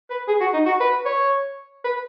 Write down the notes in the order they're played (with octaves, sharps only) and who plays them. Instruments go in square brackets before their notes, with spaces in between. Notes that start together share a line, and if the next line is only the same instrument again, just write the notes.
[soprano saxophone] B4
G#4
F#4
D#4
F#4
B4
C#5
B4